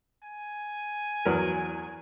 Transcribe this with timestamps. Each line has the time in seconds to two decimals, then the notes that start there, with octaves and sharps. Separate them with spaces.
0.23 G#5
1.25 E2 F#3 A#4